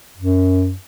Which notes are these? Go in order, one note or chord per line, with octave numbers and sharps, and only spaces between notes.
F#2